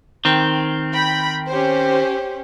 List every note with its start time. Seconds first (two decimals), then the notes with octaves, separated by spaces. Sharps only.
0.25 D#3 C4
0.94 G5 B5
1.49 C#4 G4 C5